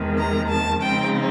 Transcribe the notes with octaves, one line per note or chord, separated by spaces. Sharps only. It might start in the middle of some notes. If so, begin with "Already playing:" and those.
Already playing: E2 C3 D#3 G#3
A#5
A5
C#3 F3 G#3 C4 D#4 G5